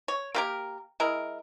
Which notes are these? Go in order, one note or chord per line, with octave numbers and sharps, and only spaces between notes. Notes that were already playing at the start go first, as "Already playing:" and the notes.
C#5
A#3 G4 A#4
G#3 E4 A#4